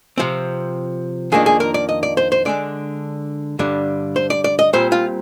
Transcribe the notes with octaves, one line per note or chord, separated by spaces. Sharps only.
C3 F3 C4
F2 D#3 A#3 D4 G#4
G#4
A#4
D5
D#5
D5
C5
C5
D3 G#3 D4 D5
G2 D3 G3 D4
C5
D5
D5
D#5
A#2 G3 C4 C5
F4